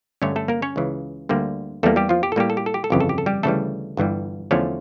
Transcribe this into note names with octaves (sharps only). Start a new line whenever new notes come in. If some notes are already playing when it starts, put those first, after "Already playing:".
G2 D3 A3 C#4 C#5
A3 A4
A#3 A#4
C#4 C#5
C#2 C#3 E3
D2 D3 G3 A#3
E2 E3 G3 A3 A#3 A4
G3 G4
F3 F4
G4
A4
A2 G3 A#3 G4
A4
G4
A4
G4
A4
G1 F2 C#3 E3 G4
A4
G4
A4
G3 G4
D2 C#3 E3 G3 A3 A4
G1 G2 E3 G3
E2 D3 F3 A3 C#4 C#5